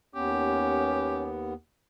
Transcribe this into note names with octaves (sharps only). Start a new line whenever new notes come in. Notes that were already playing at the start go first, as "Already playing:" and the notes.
D#2 B3 C#4 G4